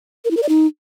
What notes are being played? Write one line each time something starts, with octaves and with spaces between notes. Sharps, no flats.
A#4
E4
A#4
D5
D#4